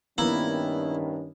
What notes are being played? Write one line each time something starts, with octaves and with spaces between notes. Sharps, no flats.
G2 D#3 A#3 B3 C#4 E4